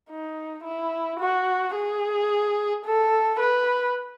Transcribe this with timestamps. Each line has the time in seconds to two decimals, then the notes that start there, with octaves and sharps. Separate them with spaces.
0.10 D#4
0.64 E4
1.20 F#4
1.75 G#4
2.85 A4
3.40 B4